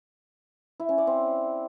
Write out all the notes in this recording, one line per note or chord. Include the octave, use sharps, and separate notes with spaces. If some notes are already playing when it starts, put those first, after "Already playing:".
E4
C#4
D5
C4